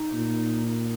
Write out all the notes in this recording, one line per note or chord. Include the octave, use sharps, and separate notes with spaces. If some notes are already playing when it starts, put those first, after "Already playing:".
Already playing: D#4
A#2
D#4